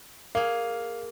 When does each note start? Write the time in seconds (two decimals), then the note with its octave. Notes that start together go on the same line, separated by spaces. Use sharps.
0.35 A#3 G#4 F5